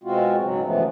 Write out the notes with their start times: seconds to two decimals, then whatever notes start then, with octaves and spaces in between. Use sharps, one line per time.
0.04 B2 G#3 C4 F4 F#4
0.40 G#2 C#3 F#3
0.63 F#2 D3 E3 F3 A3 B3